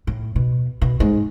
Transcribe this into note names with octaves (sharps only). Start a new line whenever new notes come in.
A2
B2
B2
G#2